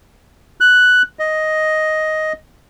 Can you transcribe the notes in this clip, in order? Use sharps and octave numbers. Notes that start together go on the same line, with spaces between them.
F#6
D#5